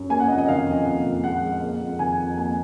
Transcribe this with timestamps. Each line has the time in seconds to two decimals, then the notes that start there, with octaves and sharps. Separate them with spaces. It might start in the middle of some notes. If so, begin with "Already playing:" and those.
Already playing: F#2
0.10 A#3 G#5
0.20 F#5
0.28 F2 D#5
0.38 D#5
0.48 D#3 F5
0.66 F2
0.85 A#2
1.04 A#2
1.24 G#3 F#5
1.43 G#3
1.61 A#3
1.81 F2
1.99 D#3 G#5
2.19 F2
2.38 A#3 G#5